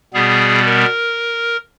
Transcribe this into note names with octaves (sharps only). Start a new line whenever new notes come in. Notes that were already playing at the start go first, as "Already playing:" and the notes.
B2 G3 B3 G#4
A#4